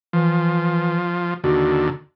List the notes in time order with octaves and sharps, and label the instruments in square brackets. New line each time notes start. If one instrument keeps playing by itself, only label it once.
[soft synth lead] E3 [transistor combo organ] F3
[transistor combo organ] D#2 D3 [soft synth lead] F#4